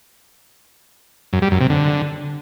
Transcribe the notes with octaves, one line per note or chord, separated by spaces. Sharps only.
F#2
G3
F#2
C3
D3